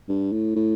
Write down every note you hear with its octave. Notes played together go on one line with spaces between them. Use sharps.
G2
A2
A2